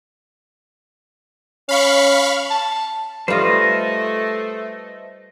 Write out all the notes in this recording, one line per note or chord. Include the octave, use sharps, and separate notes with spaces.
C#4 F5 B5 C#6
A5
G3 A3 F4 B4 C5 D#5